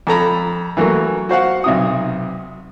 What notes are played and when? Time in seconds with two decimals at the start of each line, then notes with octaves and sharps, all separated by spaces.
0.07 F2 A4 A#5 B5
0.77 E3 F#3 A3 A#3
1.29 F#4 C5 F5 F#5
1.64 B1 C3 D#6